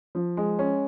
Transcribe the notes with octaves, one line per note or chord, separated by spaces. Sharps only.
F3
G#3
C#4